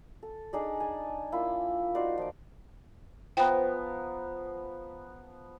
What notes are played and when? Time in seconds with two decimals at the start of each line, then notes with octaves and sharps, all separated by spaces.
0.23 A4
0.53 D4 D#4 G#4 D5
0.80 G#5 A5
1.32 A#3 E4 F4
1.95 D#4 F#4 C5 D5
2.18 F3 D6
3.37 F3 B3 G5 A#5